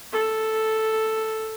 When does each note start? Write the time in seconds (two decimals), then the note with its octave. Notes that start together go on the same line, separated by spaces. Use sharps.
0.12 A4